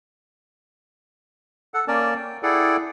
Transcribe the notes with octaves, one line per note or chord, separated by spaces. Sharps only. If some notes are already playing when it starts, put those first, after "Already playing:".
A4 F#5
A#3 C#4 A#4 D5 A5
G5
E4 G#4 A4 D5 F#5 G5